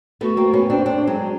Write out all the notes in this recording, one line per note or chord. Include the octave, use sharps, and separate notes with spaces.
A3 B3 F#4
A#3 C4
B3 C#4
C4 D4
C4 D4
F#3 G#3